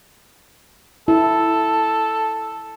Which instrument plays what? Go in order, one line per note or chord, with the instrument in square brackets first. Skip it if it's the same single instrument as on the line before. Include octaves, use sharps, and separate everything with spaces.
[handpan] E4 [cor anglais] A4